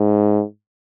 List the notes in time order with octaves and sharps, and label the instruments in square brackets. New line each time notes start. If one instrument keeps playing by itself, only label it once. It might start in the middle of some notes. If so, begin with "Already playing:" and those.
Already playing: [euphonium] G#2